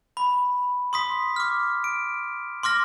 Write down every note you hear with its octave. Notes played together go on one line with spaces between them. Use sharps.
B5
C6 D#6 B6
D6 F6
D7
C6 D6 F6 A#6